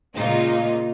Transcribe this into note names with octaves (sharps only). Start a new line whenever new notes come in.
A#2 C#3 G#3 A#3 D#4 F4